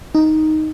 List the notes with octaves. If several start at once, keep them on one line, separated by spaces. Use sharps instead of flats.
D#4